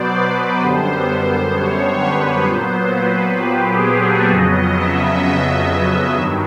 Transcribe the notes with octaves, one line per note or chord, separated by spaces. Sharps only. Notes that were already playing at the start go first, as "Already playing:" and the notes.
Already playing: B2 F#3 B3 C5 D5
B4
F#2 D3 G3 B3 C5
C5
C#5
B4
A#2 F#3 B3 C5
B4
G4
G#4
A4
F2 C#3 F#3 B3 D#5
E5
G2 D#3 F#3